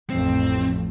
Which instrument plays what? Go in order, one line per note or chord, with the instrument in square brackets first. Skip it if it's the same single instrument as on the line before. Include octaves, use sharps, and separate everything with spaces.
[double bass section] A1 F2 A3 [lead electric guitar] C4